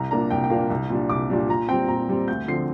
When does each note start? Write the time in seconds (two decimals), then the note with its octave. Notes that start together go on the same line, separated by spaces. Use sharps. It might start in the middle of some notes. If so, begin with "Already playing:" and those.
Already playing: C2 A#5
0.11 A#2 A#3 D4 A#5
0.30 C2 G5
0.44 G5
0.50 A#2 A#3 D4 F5
0.70 C2
0.90 A#2 G3 D4
1.10 C2 D6
1.30 A#2 G3 D4
1.49 A#2 A#5
1.69 G3 C4 G5
1.88 A#2 A#5
2.09 G3 C4
2.28 D2 G6
2.48 D3 F3 C4 C7